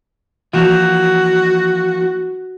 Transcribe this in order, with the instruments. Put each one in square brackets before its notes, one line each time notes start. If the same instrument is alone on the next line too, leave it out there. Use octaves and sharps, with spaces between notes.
[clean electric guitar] E3 F3 A#3 [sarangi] F#4